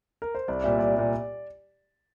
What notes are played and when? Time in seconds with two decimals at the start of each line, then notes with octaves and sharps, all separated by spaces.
0.22 A#4
0.35 C5
0.48 C2 D5
0.64 A#2 G3 E5
0.79 C2 D5
0.96 A#2 G3